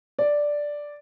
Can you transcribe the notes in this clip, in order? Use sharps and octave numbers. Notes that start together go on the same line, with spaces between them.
D5